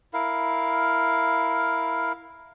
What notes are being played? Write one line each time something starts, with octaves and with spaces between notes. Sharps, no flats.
E4 A#4 F5